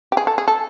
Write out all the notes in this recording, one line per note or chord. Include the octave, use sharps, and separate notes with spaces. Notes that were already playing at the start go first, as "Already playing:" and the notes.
G4
G#4
A4
G#4
A4